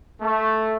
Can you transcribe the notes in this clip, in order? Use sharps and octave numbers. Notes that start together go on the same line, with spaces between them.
A3